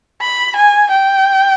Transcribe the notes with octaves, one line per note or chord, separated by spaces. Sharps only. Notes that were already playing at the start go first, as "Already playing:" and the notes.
B5
G#5
G5